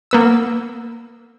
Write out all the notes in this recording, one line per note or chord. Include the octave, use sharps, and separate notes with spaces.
A#3 B3 E6